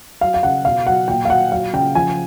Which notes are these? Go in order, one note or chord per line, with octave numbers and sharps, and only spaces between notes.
F#3 F5
F5
C#3 F#5
B2 F5
F#3 F#5
A#2 G5
F5
F#3 F#5
F#3 F5
C#3 G5
F3 G#5